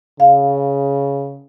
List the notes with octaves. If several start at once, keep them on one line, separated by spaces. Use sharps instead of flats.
C#3 F5